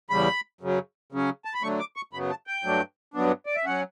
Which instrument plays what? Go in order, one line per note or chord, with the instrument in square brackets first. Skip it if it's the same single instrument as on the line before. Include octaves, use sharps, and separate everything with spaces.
[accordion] E2 C#3 G3 B5
F#2 C#3 F#3
C#3 F#3 C#4
A5
B5
D3 F#3 A3 C#6
D6
C#6
F#2 C#3 F#3 B3 B5
A5
G5
G2 F#3 A3 D4
G2 F#3 B3 D4
D5
E5
F#3 C#4 F#5